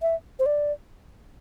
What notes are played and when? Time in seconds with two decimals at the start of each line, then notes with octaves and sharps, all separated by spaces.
0.02 E5
0.39 C5
0.46 D5